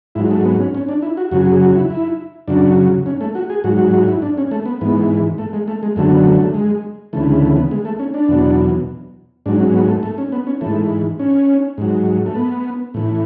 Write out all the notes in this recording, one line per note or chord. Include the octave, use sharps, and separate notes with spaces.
G#2 F#3 E4
A3
B3
C#4
C#4
D4
E4
F#4
F#2 C#3 F#3 F#4
G#4
F#4
E4
E4
F#2 C#3 F#3 D4
C#4
A3
F#4
G#4
G#2 F#3 F#4
F#4
F#4
E4
D4
C#4
A3
B3
G#2 E3 B3
A3
G#3
A3
G#3
F#2 D3 F#3 A3
B3
A3
A3
G#3
D2 C#3 E3 A3
G#3
A3
B3
G#3
A3
C#4
D4
E2 B2 F#3
G#2 F#3 D4
C#4
B3
A3
A3
C#4
B3
C#4
G#2 E3 A3
C#4
G#2 F#3
A3
B3
A2 E3